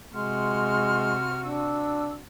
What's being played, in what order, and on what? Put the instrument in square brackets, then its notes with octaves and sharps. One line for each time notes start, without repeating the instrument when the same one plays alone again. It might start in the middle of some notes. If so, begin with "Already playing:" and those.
[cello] C3 F#4 [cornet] G#3 [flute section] C6 F6
[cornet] D4 [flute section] E6